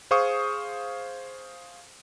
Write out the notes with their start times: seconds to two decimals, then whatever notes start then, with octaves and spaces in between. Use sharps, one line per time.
0.11 G#4 C5 F5 C#6 D#6